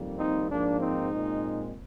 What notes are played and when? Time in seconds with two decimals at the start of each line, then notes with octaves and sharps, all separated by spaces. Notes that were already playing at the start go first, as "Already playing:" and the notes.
Already playing: F2 D#3 G3 A#3
0.18 C4 D#4
0.49 G#2 F3 A#3 D4
0.80 C4 D#4
1.12 A#2 G#3 C4